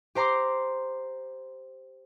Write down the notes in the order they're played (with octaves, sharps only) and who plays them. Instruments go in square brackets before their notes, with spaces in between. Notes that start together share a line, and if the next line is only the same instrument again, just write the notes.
[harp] G4 C5 A#5 C6 D6